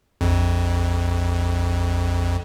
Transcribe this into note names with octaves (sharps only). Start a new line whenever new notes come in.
A#1 F2